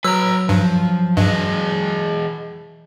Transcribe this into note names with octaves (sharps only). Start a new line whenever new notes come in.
F#3 B4 A#5 E6
G2 F3
G2 E3 G#4 D#5